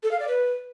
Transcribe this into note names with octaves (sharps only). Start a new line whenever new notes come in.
A4
F5
D5
B4